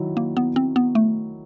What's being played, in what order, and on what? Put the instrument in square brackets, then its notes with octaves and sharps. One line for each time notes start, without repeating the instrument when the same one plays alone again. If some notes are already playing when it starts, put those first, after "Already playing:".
Already playing: [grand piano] D#3 F#3 E4
[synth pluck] A#3
B3
C4
B3
A3